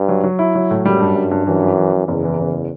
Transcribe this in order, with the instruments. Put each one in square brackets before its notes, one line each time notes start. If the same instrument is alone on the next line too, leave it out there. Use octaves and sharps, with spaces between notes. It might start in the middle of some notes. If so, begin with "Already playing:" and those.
Already playing: [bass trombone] G2
[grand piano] F#3
F#3
E4
F#3
A2
[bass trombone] F#2 [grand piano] G3
[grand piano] G2
G2
G2
[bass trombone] F#2 [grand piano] E3
[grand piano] E3
E3
E3
[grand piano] F#1 [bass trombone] E2
[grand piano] E3
F#1